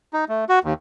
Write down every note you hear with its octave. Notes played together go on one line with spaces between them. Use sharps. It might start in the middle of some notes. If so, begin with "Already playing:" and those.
D#4
A3
F#4
D#2